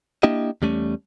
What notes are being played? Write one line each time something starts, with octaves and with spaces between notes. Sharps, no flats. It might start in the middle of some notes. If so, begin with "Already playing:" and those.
A#3 D4 E4 G4 D#5
E2 G3 A3 C#4